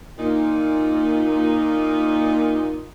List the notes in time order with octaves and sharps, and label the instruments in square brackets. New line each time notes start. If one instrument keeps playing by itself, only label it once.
[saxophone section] A#2 D#4